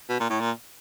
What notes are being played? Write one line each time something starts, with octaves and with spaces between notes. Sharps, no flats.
B2
A#2
A2
A#2